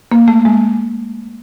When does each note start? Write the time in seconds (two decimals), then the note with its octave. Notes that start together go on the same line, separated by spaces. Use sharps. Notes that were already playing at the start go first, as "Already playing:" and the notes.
0.12 A#3
0.28 A3
0.45 G#3